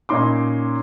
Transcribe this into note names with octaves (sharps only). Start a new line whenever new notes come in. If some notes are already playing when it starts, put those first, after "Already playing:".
A#2 C#4 D#4 C6 D6